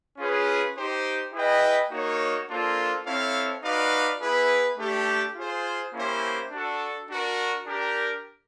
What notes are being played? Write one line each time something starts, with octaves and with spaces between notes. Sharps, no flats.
C#4 F4 G#4 B4
D#4 G4 C5
E4 G#4 B4 D#5 G5
A#3 D#4 F#4 A#4 C#5
A#3 D4 F4 A4 C5
C4 E4 A4 C#5 F5
D#4 F#4 B4 D5 F5
B3 E4 G#4 B4
A3 D4 G4
F4 G#4 C5
A#3 C#4 E4 G4 C5
D4 F#4 A4
D4 F#4 A#4
D4 G4 A#4